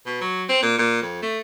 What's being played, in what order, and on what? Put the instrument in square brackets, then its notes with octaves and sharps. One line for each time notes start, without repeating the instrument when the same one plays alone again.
[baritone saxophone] B2
F#3
C4
A#2
A#2
F2
A3